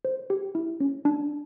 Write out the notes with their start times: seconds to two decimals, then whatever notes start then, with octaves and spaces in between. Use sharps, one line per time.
0.05 C5
0.30 G4
0.55 E4
0.80 C#4
1.05 D4